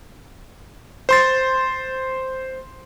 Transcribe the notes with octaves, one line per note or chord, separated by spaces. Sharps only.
C5 C6 A6